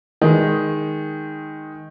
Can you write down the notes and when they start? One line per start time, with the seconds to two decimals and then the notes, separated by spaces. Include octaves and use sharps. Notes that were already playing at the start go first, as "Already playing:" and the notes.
0.21 D#3 G#3